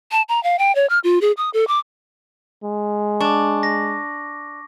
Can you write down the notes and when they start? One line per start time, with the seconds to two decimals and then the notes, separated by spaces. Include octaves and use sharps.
0.12 A5
0.29 A#5
0.43 F5
0.59 G5
0.75 C#5
0.90 F6
1.04 F4
1.21 G#4
1.37 D#6
1.54 A4
1.68 D6
2.64 G#3
3.21 D4 C#6 D6
3.63 A#6